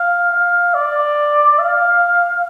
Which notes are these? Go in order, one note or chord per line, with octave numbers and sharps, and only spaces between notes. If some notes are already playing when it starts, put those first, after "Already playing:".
Already playing: F5
F5
D5
F5